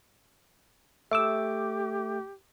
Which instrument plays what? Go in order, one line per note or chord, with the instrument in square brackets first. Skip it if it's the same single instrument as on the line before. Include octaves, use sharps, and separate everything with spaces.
[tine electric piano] A3 D6 [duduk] G4 [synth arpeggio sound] E5 E6